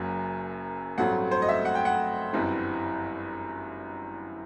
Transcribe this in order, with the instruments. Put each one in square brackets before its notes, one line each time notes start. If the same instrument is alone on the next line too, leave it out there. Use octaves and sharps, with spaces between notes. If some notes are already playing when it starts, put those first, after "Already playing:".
Already playing: [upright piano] F#1 F#2 F#3
A1 G2 F#3 A3 C4 F#5
C5
D#5
E5
F#5
G5
F#5
G1 F#2 E3 G3 C4